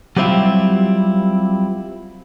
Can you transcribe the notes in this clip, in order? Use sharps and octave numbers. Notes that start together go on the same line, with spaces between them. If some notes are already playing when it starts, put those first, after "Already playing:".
F#3 G3 C4 E4 F4 G4